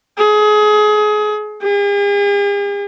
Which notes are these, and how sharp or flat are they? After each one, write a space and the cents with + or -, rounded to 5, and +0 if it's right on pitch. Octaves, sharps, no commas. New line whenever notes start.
G#4 +30
G#4 -45